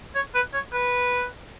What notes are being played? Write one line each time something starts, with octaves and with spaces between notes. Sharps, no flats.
C#5
B4
C#5
B4